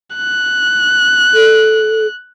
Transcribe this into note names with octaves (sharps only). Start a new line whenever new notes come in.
F#6
A4